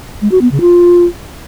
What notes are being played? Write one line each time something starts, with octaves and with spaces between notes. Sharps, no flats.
G#3
F#4
B3
C#3
F4